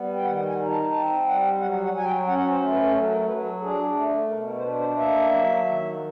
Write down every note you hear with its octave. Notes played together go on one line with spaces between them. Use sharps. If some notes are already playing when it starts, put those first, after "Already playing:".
Already playing: G3 B3
G5
D#3 F#5
G#5
D#4
A5
C4 A5
G3 F#5
F#3 F#5
F#5
F#3 G#5
G5
C#4 F#5
C5
A3
B4
F#3 A4
A#4
F#3 B4
A4
D4 G#4
A3
B2 A#4
A#4
C5
D4 B4
C5
A#3 E5
F#3
D#3